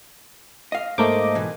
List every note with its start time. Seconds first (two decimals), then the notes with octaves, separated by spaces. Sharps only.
0.72 D#5 F5
0.98 G#2 A3 A#3 C5 D#5 D6
1.35 B2 E3